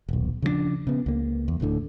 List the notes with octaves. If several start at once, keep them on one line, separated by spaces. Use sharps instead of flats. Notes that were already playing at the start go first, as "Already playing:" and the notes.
D#1 B1
C#3 F3 G#3 D4
C#3 B3
C#2 A#3
E2
D1 D2 A2 D3